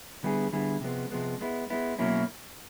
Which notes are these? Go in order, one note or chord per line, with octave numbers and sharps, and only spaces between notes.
D3 G3 B3 E4 G#4
D3 G3 B3 E4 G#4
C3 F3 G#3 B3
C3 F3 G#3 B3
G#3 B3 E4
G#3 B3 E4
B2 F#3 A#3 C#4 E4